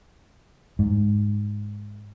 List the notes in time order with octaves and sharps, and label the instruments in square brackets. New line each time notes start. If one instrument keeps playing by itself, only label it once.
[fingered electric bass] G#2